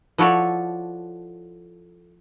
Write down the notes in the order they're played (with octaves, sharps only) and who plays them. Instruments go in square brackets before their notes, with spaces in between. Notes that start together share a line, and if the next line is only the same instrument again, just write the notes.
[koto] F3 E4 F#4 A4 C#5 D5